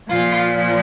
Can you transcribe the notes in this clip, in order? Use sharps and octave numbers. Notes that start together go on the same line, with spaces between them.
A#2 F3 F4